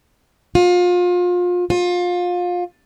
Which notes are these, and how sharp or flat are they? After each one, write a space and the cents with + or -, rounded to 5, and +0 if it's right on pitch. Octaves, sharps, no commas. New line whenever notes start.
F4 +30
F4 +25